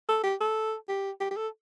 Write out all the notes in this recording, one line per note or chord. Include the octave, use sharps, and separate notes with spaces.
A4
G4
A4
G4
G4
G4
A4